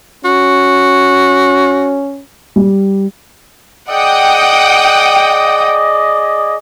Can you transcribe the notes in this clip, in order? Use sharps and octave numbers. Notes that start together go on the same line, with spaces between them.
C#4 F#4
G3
G#4 D5 D#5 F#5 G5 D#6